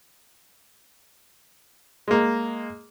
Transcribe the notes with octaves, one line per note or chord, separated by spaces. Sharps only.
G#3 A#3